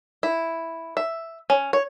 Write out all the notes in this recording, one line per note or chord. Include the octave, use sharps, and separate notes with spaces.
E4
E5
C#4
C#5